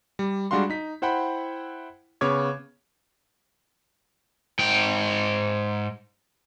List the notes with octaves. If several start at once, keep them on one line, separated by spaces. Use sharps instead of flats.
G3
G3 G#3 D4 F#4 F5 C6
D#4 B6
E4 C5 F#5 G5 B5
C#3 B3 C#5 D6 G#6
G#2 G5